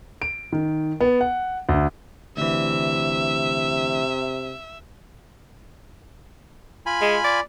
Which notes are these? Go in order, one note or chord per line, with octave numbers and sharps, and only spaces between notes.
D7
D#3
B3
F#5
D2
D2 C3 E3 E5
F4 G#5 B5
G#3
D5